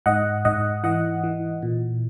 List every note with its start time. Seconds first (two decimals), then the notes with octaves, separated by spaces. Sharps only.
0.06 G#2 D#5 F#5
0.45 G#2 D#5 F#5
0.83 E3 D#5 F#5
1.23 E3
1.63 A#2